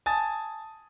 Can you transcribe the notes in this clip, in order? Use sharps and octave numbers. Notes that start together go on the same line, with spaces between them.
G#5 A5 D#6 A6